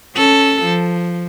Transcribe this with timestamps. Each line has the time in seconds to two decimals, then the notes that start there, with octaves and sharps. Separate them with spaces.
0.15 C#4 A4
0.63 F3